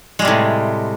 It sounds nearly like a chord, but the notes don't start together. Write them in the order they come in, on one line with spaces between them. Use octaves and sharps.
G#3 G3 C3 A2